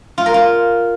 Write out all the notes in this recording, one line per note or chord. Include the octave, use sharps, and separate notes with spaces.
F4
A#4
F4